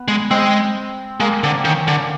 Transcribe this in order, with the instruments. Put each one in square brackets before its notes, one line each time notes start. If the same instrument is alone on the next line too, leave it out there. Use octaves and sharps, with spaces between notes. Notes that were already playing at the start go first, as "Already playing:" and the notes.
Already playing: [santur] B3
[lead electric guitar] G#3
[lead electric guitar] G#3 [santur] C4
[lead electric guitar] G#3 [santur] A#3
[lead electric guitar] D3 [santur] C4
[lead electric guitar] D#3 [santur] C#4
[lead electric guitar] D3